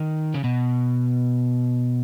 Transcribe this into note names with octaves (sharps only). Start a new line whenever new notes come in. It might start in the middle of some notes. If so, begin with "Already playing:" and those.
Already playing: D#3
C#3
B2